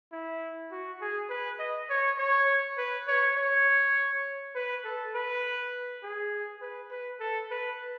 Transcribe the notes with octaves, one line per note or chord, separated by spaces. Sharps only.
E4
F#4
G#4
B4
D#5
C#5
C#5
B4
C#5
C#5
B4
A4
B4
G#4
B4
B4
A4
B4